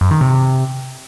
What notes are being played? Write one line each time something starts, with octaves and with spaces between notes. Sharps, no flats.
F#2
D#3
C3